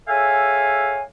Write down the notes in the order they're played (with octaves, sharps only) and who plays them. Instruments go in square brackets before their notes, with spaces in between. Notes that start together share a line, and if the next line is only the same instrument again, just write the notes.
[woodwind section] G#4 A4 C#5 E5 F5 G#5